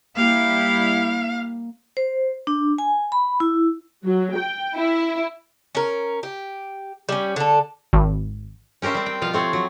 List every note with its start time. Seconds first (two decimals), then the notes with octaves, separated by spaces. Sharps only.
0.16 G3 A#3 E4 G4 F5
1.97 C5
2.47 D4
2.78 G#5
3.12 B5
3.40 E4
4.05 F#3
4.35 G5
4.75 E4
5.75 C#4 A#4
6.23 G4
7.09 G3 C#4
7.36 D3 A4
7.93 G#1
8.82 C#4 G4 A#4 C5 E5
8.94 G3 C4
9.06 G5
9.21 B2 F3 F4 F5
9.33 A3 C4 C#5
9.53 F#3